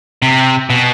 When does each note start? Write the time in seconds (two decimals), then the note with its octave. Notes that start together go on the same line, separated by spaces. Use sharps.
0.22 C3
0.70 B2